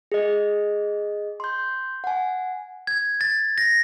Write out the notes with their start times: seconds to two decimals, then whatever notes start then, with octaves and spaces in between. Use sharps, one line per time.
0.12 G#4 D#5
1.40 C6 G6
2.04 F#5 G#5
2.87 G#6
3.21 A6
3.58 A#6